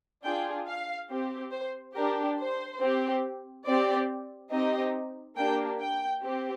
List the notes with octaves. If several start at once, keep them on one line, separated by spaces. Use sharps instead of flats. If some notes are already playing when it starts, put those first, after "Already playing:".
D4 F4 G#4 G5
F5
C4 G4
C5
D4 G4 A#4
C5
C4 G4
C4 G4 D5
C4 D#4 G4 D#5
A#3 D4 G4 G5
G5
C4 G4